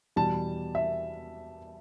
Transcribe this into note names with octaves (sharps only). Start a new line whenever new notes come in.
E2 B2 G3 A5
E5